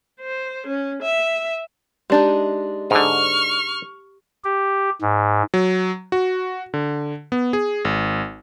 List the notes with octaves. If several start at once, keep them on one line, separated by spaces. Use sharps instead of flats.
C5
C#4
E5
G#3 D4 D#4 G4 A5
G#2 D3 C#6 F6
G4
G#2
F#3
F#4
D3
B3
G#4
G#1